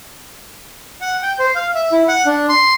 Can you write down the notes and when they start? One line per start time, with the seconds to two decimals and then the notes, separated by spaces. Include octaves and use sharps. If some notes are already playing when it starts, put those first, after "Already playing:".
1.01 F#5
1.23 G5
1.39 C5
1.55 F5
1.75 E5
1.92 E4
2.08 F#5
2.26 D4
2.49 C6